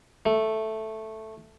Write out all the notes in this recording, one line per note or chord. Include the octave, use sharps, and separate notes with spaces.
A3